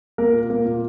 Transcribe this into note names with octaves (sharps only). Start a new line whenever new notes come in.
A#3 A#4
A#2
A#3
A#2